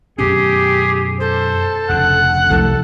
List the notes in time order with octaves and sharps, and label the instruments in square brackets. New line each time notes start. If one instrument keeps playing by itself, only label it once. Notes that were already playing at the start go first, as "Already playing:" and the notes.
[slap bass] F#2 B2 C#4 [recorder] G4 [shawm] G#4
[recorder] A4 [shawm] C5
[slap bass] F1 D2 C#3 [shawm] F#5
[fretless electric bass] C2 F3 A3 [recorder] A4